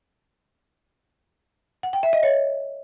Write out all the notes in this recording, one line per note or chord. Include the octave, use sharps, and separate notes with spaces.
F#5
G5
E5
D#5
C#5